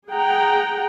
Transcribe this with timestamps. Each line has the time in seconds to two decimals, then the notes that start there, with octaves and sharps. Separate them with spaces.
0.11 G#4 F#5 G5 A#5